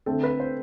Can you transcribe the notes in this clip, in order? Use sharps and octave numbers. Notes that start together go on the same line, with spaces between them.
D3 A3 C4 A4
B4
C5